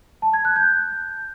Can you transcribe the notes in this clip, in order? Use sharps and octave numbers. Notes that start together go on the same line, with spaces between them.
A5
G#6
F#6
G6